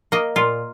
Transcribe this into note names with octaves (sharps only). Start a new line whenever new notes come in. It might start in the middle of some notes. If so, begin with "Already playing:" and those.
A#3 D#5
A#2 F4